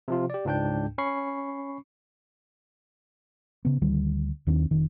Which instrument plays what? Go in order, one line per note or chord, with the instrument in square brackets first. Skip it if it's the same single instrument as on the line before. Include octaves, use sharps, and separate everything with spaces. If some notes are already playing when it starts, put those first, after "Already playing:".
[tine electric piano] C3 F3 F4
G4 D5
C#2 G#2 D4 G5 G6
C#4 B5 C#6 C7
[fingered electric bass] C#3 B3
D2 D#3 G3
D#2 D#3 C4 D4
F1 D#3